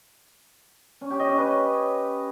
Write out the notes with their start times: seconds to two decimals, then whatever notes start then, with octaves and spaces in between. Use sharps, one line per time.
1.01 C#4
1.10 G4
1.19 D#5
1.29 C#4
1.38 B4